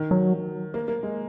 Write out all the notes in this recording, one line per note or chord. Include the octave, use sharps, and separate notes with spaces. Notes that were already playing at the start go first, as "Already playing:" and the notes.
Already playing: D#3
F#3
A#3
A#3
G#3